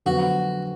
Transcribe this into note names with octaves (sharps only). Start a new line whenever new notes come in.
F2 D3 F#3 B3 F#4